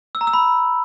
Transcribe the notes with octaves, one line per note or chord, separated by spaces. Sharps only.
E6
A#5
E6
B5